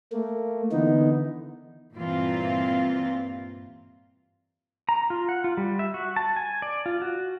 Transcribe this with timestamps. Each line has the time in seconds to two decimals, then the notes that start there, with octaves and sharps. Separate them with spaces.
0.12 A3 A#3
0.72 D3 E3 B3 D#4
1.95 G2 A#2 E3 A#3 C4 F4
4.89 A#5
5.10 F4
5.29 F#5
5.44 F4
5.57 G3
5.79 E5
5.94 F#4
6.16 A5
6.36 G#5
6.62 D5
6.86 F4
7.02 F#4